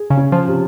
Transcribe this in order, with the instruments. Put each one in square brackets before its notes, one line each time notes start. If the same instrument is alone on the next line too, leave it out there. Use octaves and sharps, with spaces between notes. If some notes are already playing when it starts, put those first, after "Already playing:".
Already playing: [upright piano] G#4
[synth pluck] C#3
[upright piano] C#4
[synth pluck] F3
[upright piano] C3